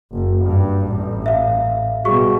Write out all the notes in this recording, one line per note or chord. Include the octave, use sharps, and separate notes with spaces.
F#1
G2
A1
E5 F5
B2 G3 F#4 G#4 C#6